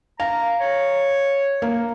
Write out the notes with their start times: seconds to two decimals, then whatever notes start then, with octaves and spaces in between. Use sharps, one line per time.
0.20 F5 A#5
0.60 C#5
1.62 A#3